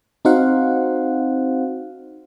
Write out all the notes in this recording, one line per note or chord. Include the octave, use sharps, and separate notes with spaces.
C4 D#4 F#4 C5 F5 F#5